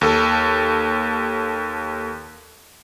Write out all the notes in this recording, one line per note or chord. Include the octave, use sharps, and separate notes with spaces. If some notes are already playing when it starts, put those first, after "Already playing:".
D#2 A4